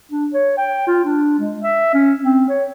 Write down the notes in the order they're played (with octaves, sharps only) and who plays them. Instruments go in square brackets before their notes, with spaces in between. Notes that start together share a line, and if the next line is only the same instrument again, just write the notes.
[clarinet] D4
C#5
G5
F4
D4
G#3
E5
C#4
C4
C#5